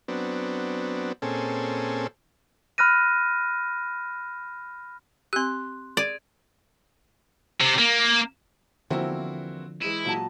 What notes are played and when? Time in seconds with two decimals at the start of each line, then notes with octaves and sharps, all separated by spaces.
0.08 F#3 B3 C4 D4
1.22 A#2 C4 C#4 G#4 A4
2.78 B5 F6 F#6 A#6 D#7
5.33 C4 G4 C6 F#6
5.97 G#4 D5 G#6 D#7
7.60 C3
7.79 A#3
8.90 E2 D3 F3 A#3 C4 E4 F#4
9.82 E3 G#3 E4 D#7
10.05 A#2 F#3 A5